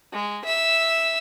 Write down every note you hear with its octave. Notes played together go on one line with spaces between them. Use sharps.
G#3
E5 E6